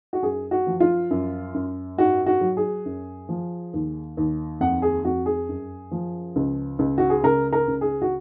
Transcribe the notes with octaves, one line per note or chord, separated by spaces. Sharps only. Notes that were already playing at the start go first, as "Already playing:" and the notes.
F#4
F#2 G#4
F#4
F3
F4
F#2
F#2
G#2 F#4
F#4
F#3
G#4
F#2
F3
D#2
D#2
F2 F#5
G#4
F2 F#4
G#4
F#2
F3
C#2
C#2
F#4
G#4
C#2 A#4
A#4
C#2
G#4
F#4